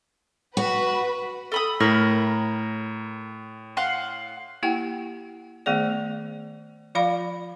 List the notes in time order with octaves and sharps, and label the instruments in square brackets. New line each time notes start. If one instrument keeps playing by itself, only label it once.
[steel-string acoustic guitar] F#4 [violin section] B4
[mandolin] A4 B5 D#6
[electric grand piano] A2 [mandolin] A#4 B5
[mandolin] F5 F#5 C6
[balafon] A#3 E4 G4 F#5 G5
D#3 A3 B3 G#4 D5
F3 F4 D5 F5 B5